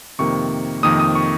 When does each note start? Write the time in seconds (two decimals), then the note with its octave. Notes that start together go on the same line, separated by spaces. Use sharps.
0.19 F2 C3 D#3 A#3 C#6
0.83 F2 C3 D#3 A#3 D#6
0.99 D#6
1.15 C#6